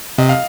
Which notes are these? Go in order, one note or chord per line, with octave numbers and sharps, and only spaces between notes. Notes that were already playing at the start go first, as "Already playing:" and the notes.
C3 D#5
F5